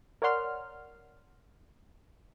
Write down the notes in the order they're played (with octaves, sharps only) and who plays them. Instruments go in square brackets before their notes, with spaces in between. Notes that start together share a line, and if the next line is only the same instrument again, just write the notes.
[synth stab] A#4 C#5 D5 F#5 C6 F6